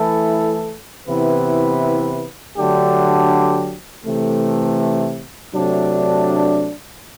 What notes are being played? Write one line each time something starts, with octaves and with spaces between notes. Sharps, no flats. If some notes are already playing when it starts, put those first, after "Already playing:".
Already playing: E3 A3 E4 A4
C3 E3 B3 E4 B4
D3 F#3 A3 D4 G4
C3 E3 A3
C3 F#3 A3 D4